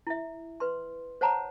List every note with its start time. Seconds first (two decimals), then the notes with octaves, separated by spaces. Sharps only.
0.07 E4 E5
0.60 B4 C6
1.21 C5 C#5 F#5 A5 A#5